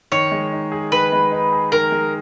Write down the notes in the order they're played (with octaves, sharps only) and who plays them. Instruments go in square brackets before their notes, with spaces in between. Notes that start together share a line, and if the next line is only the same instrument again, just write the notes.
[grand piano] D#3 [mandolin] C#5
[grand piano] G#3
D#4
G#4
[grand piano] D#3 [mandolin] B4
[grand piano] G#3
D#4
G#4
[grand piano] D#3 [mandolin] A#4
[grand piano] G#3